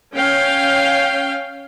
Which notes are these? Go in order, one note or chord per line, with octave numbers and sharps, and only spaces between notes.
C#4 F5 G5